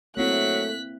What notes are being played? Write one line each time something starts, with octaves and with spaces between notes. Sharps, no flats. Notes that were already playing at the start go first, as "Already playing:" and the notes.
F#3 A3 A#3 C4 E4 F#6 B6